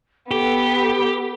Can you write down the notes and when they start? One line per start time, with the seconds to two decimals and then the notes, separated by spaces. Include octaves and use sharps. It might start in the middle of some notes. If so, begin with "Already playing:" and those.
0.31 B3 G4 A4